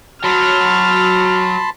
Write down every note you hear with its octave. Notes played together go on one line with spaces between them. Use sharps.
F#3 A5 B5 C6 F6